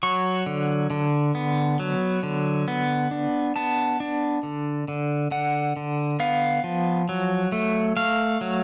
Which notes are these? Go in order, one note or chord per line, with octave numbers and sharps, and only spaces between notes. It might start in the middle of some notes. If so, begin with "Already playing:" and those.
F#3 C#6
D3
D3
B3
F#3
D3
B3
D4
B3 A5
D4
D3
D3
D3 F#5
D3
B3 F5
F3
F#3
A3
A3 F5
F#3